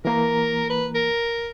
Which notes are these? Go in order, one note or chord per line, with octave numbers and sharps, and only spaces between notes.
E3 A#3 A#4 A#5
B4
A#4